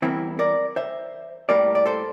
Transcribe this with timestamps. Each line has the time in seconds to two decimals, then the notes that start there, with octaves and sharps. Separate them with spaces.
0.02 E2 E3 G3 A#3 C4 E4
0.39 A#4 D5
0.76 C5 E5
1.49 A2 G3 A#3 A#4 D5
1.75 D5
1.86 A4 C5